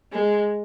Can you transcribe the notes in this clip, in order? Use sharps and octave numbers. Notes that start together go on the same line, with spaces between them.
G#3